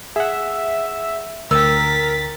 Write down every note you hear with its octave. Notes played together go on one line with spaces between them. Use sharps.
G#4 E5 F#5
D2 A#4 G5 E6 A6 B6